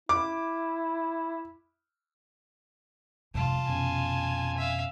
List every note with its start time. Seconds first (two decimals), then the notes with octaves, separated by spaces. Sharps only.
0.09 E4 D6
3.34 G1 F2 G#2 C3 E3 F4 A5
3.68 F2 B2 C#4 G#5
4.58 E5 F5